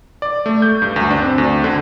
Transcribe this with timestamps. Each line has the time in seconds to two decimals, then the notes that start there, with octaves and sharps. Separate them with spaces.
0.22 D5
0.46 A3
0.62 G6
0.82 G2
0.96 D2
1.11 D4
1.22 C4
1.38 D2
1.64 D3